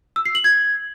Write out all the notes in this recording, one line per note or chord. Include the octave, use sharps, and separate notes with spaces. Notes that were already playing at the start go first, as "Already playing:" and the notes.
E6
C7
F#7
G#6